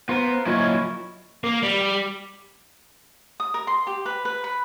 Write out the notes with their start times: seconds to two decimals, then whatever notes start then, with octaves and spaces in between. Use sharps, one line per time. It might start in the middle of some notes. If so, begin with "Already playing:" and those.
0.09 B3 F4 A#4 C5
0.46 A#2 F#3 C#4 E4 C#5 D#5
1.44 A#3
1.63 G3
3.40 D#6
3.54 A#4
3.67 C6
3.87 G4
4.06 B4
4.25 B4
4.44 B4